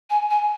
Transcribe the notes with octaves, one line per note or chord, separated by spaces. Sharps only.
G#5
G#5